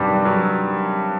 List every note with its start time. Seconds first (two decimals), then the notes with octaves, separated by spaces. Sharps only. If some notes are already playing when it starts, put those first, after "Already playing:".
Already playing: G2 C3 D#3 F#3 G3
0.25 F#3